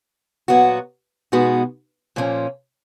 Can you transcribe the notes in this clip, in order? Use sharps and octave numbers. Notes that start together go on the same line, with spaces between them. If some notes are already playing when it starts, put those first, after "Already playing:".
A#2 F#3 B3 F#4
B2 G#3 B3 D#4 F#4
A#2 F3 A#3 C#4